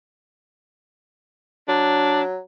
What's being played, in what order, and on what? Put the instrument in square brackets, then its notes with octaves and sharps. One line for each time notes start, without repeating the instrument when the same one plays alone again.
[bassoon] F#3 [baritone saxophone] D4